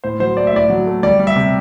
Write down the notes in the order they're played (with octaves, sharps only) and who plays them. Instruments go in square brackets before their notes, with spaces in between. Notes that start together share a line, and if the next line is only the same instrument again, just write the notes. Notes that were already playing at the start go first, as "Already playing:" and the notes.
[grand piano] A2 C5
F#3 C5
A3 D5
E5
A2 D5
F#3
A3
G3 D5
G3
E5
C3